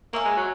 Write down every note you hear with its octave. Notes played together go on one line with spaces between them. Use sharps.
A#3 C#5 E5 G#5
G#3
F#3